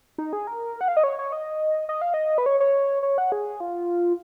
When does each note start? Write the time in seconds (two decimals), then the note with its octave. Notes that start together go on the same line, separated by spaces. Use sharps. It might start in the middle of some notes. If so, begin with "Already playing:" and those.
0.18 D#4
0.33 G#4
0.47 A#4
0.81 F#5
0.88 F5
0.97 D#5
1.04 C#5
1.19 C#5
1.32 D#5
1.89 D#5
2.01 F5
2.14 D#5
2.38 B4
2.46 C#5
2.60 C#5
3.03 C#5
3.18 F#5
3.32 G#4
3.60 F4